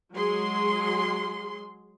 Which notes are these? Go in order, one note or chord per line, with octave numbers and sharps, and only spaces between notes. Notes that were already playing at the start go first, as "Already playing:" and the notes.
F#3 G#3 G#4 C6